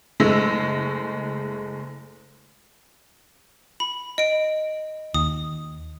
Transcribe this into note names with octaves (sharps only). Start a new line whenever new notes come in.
F#1 G#3 A3 E6 A#6
B5
D#5 D7
D#2 D#6